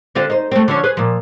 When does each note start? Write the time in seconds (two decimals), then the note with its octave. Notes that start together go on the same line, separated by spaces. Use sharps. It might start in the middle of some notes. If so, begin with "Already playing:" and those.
0.15 D3 C4 F4
0.29 D#4 C5
0.52 A3 C4
0.68 D3 F3 C#4
0.83 G#4 B4 C5
0.97 A#2 F3